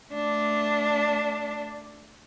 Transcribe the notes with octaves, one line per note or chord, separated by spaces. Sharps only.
A3 D4